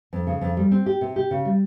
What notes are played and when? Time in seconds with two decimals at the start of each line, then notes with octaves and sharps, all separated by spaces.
0.13 F2
0.27 C#3
0.41 F2
0.57 G3
0.71 C4
0.86 G4
1.01 C3
1.16 G4
1.31 C#3
1.45 G3